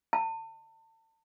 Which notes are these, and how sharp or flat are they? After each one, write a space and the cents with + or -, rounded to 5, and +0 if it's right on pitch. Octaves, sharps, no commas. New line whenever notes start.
A5 +35